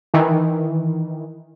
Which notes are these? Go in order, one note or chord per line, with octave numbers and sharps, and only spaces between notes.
D#3 E3